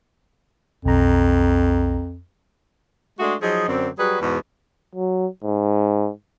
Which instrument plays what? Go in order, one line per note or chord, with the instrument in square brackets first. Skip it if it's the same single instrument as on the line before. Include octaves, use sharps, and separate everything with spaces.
[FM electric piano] B1 A#5 [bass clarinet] F2
[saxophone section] G#3 A3 D4 F#4 G#4
F3 F#3 D#4 G#4
F#2 D3 C4
F#3 G3 F#4 G#4 B4
E2 G#2 B2
[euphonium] F#3
G#2